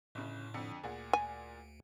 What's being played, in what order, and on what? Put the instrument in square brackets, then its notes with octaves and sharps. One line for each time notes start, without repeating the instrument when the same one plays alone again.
[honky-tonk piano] G1 C#3 [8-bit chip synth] A2
[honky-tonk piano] F2 D3 C#7
[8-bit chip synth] D2 [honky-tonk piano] A#2 G#4 F#5
[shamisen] G#5